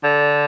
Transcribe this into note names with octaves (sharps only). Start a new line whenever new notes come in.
D3